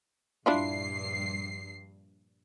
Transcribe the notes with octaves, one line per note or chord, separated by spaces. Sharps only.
A#1 G2 D4 E4 F4 C7